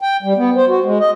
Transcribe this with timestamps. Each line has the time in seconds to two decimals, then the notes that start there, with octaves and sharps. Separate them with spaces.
0.01 G5
0.23 G3
0.37 B3
0.56 C5
0.68 F#4
0.84 G#3
1.00 D#5